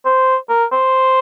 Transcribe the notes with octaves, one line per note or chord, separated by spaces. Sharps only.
C5
A#4
C5